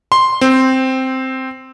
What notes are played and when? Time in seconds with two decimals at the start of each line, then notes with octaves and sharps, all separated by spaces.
0.12 C6
0.41 C4